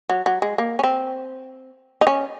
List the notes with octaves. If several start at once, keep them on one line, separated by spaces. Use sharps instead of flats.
F#3
F#3
G#3
A#3
C#4
C4
D#4
C#4